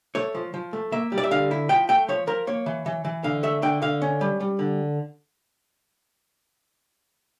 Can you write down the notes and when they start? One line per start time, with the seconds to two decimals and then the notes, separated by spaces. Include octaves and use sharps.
0.15 A3 C#5
0.35 F3
0.54 F3
0.73 A3
0.92 A#3 E5
1.12 G3
1.18 D5
1.24 E5
1.31 D3 F5
1.51 E4
1.69 F3 G5
1.89 A3 G5
2.08 F3 C#5
2.27 F3 A#4
2.47 A#3 C#5
2.66 E3
2.86 E3
3.05 E3
3.24 D3 F5
3.43 A3 E5
3.63 D3 G5
3.82 D3 F5
4.02 C#4
4.21 G3
4.40 G3
4.59 D3